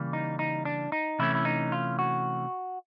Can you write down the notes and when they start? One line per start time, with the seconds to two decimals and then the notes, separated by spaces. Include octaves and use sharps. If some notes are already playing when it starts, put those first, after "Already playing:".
Already playing: C#3 E3 G3 A#3
0.13 D#4
0.39 D#4
0.65 D4
0.92 D#4
1.19 C3 E3 A3 C#4 E4
1.35 E4
1.45 D#4
1.72 F4
1.99 F#4